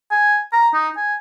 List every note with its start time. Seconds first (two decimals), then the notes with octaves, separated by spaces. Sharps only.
0.11 G#5
0.52 A#5
0.74 D#4
0.97 G#5